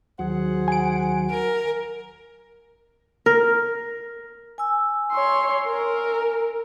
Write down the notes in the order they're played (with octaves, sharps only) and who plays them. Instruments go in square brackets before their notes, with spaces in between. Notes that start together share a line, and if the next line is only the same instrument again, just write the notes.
[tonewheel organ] D#2 F#3 [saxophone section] G#4 C5 F#5
[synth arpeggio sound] G#5 D7
[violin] A#4
[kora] A#4
[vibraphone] G#5 E6
[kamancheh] C#5 C6
A#4